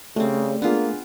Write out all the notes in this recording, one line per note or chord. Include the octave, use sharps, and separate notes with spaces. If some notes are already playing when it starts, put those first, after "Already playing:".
C#3 G3 A3 C4
A#3 B3 D4 F4 G#4